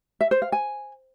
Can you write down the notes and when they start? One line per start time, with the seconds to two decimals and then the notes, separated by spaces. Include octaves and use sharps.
0.21 E5
0.31 C5
0.42 F5
0.52 G#5